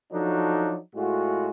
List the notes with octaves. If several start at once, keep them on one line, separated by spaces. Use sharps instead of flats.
F3 F#3 D4 D#4 F#4 A4
A2 G#3 F4 F#4